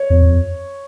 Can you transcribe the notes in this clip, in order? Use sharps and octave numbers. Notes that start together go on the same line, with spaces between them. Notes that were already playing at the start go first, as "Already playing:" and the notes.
Already playing: C#5
F2
F2